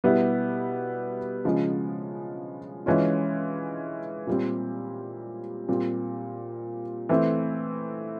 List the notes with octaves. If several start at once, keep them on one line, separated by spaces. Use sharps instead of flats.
B2 G3 B3 E4
C#3 F3 G#3
E3 G#3 C#4 F4
A#2 G3 C4
A#2 G3 C4
E3 A3 C4